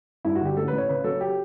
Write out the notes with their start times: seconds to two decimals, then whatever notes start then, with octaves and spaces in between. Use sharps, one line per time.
0.25 G2 E4
0.35 F#4
0.41 D3 G4
0.57 A1 A4
0.68 B4
0.73 A1
0.78 C#5
0.88 C#3 B4
1.04 F#3 A4
1.21 G4